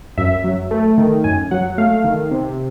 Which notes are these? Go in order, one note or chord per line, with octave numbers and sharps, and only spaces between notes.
F#2 E5
F#3
A3
D#3
F#2 G#5
F#3 F#5
A3 F5
D#3
C3